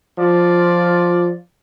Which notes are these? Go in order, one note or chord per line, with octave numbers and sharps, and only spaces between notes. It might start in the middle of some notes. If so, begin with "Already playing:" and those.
F3 F4 D5